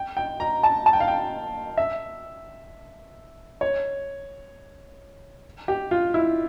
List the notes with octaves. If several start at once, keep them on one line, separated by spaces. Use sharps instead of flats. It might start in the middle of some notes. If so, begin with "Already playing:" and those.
Already playing: G5
G5
A#5
A5
A5
G5
F5
G5
E5
C#5
G4
F4
E4